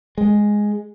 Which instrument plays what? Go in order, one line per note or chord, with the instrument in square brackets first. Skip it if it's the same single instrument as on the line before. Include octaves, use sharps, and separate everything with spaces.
[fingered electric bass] G#3